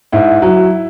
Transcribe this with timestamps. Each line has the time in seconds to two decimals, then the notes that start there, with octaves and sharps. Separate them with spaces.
0.12 G#2 E4
0.42 F#3